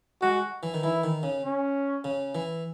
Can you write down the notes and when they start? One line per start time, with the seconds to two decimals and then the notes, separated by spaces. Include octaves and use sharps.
0.22 G#3 F#4
0.63 E3
0.74 D#3
0.83 E3 E4
1.04 D#3
1.23 C#3
1.44 C#4
2.04 C#3
2.35 E3